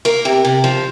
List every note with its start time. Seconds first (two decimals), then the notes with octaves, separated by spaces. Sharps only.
0.05 A#3 A#4
0.25 C3
0.45 C3
0.64 F3